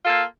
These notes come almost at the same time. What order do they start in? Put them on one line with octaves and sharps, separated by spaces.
F4 A4 A#3